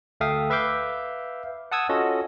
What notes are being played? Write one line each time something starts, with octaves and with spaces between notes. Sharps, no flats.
D2 A4 E5 F5 G5 D#6
B4 E5 F5 D6 G6
F#5 A5 D#6 E6 G#6
C#4 F4 F#4 A4 D#5